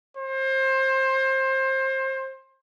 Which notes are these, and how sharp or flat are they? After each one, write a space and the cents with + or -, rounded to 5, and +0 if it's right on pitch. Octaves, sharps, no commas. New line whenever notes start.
C5 +25